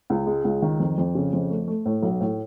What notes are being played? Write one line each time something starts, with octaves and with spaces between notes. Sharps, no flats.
C#2
G#3
C#2
D#3
F2
F2
C#3
F2
A3
A3
A2
B1
A2